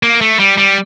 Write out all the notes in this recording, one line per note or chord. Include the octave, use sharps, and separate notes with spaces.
A#3
A3
G3
G3